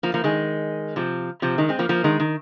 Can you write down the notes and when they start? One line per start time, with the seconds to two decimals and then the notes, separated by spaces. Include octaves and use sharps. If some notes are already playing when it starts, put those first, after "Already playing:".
0.03 F3 A#3
0.14 F3 A#3
0.24 D#3 G#3
0.96 C3 F3
1.42 C3 F3
1.58 D#3 G#3
1.69 G#3 C4
1.79 F3 A#3
1.89 F3 A#3
2.04 D#3 G#3
2.20 D#3